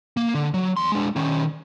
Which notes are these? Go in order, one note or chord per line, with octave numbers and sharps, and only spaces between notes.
A#3
D3
F#3
E2 C6
G#3 D4
D#3 C#4